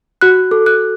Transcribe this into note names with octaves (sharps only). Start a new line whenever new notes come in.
F#4 F#6
A4
F#6